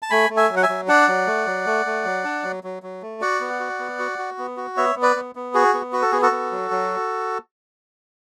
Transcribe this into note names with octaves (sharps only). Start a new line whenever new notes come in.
A5
A3 G#5 B5
A3
E5 G#5
F#3
F#5
E5 G#5
F#3
D4 D5 F#5
F#3
A3
F#3
A3
A3
F#3
D4
F#3
F#3
F#3
A3
F#4 D5 F#5
B3
F#4
B3
F#4
F#4
B3
F#4
B3 C#5 E5
B3
B4 D5
B3
B3
F#4 G#4
B3
F#4 B4
A4
B3 G#4
F#4 A4
B3
F#3
F#3